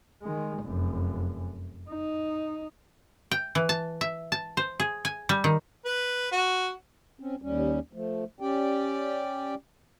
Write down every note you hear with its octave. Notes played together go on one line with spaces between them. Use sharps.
D#3 G#3
F1 F#2
D#4
G5
E3
A5
E5
A5
C5
G#4
G#5
G3
D#3
B4
F#4
C4 C#4
D#2 G3 C#4
F3 A3
C#4 G4 D5 G5